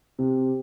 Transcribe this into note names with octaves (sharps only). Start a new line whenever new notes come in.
C3